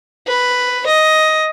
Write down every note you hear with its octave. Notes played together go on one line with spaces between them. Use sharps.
B4
D#5